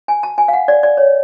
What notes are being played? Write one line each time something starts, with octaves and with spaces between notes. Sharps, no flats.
G#5
A5
G#5
F5
F#5
D5
D5
C#5